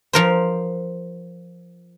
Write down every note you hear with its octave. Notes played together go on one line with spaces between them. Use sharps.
F3 A#4 C5